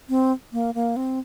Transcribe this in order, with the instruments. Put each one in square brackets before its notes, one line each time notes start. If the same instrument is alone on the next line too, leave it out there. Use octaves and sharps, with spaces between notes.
[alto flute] C4
A#3
A#3
C4